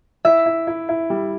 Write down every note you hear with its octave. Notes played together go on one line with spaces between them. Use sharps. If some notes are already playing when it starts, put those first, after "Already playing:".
E4 E5
E4
E4
E4
G3